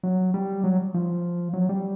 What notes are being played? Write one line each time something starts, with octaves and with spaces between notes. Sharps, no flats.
F#3
G3
F#3
F3
F#3
G3